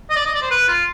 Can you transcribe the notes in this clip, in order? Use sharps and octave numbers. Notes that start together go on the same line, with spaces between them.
D#5
D5
D#5
D5
C5
B4
F4